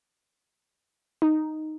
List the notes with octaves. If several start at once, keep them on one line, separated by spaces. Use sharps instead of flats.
D#4